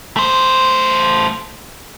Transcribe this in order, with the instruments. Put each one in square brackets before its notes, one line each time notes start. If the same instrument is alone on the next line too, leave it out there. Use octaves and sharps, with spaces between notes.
[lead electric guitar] A3 C5